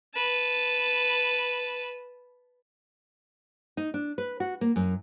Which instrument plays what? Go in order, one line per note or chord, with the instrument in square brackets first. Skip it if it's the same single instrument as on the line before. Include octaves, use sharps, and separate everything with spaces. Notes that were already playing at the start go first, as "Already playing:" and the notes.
[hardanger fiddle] B4 A5
[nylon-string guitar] D#4
D4
B4
F#4
A#3
F#2